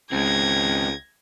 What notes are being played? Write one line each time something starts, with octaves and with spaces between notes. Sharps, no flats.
C#2 G#3 C4 G#6 A#6